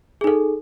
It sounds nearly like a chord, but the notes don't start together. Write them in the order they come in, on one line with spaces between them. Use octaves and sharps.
G#4 D#4 A4